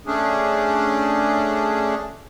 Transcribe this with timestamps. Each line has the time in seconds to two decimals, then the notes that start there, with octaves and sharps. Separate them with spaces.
0.07 A3 C#4 D4 G#4